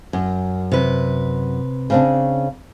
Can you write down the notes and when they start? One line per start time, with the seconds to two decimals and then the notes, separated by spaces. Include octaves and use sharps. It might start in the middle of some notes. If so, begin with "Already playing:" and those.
0.13 F#2
0.72 C3 B4
1.90 C#3 C4 D4